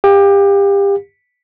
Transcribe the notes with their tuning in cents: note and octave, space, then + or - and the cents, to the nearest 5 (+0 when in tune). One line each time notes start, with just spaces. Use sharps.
G4 +25 F5 +25